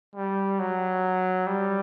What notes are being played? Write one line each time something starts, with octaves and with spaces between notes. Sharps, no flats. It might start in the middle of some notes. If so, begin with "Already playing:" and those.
G3
F#3
G3